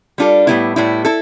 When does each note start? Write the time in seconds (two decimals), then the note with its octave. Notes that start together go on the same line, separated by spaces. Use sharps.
0.18 G3 D4 F4 A4
0.47 A2 G3 B3 E4
0.76 A2 G3 B3 E4
1.05 E4 A4